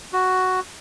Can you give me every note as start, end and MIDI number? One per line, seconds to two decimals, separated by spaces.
0.13 0.60 66